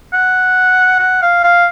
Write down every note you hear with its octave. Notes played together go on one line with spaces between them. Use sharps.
F#5
F#5
F5
F5